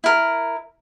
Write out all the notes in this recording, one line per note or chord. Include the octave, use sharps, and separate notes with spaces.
E4 A#4